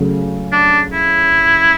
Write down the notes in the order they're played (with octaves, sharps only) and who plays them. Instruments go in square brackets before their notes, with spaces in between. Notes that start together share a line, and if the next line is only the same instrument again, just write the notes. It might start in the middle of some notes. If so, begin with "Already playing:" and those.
Already playing: [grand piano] C#3 F#3 A3 C#4
[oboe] D4
E4